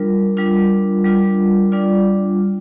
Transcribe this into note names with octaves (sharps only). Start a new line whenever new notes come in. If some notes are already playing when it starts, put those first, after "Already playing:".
Already playing: G3 D4 F4 A#4
G3 D4 F4
G3 D4 F4
G3 D4 F4 D5